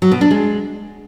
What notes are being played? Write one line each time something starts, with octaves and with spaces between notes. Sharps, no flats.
F#3
B2
D4
G#3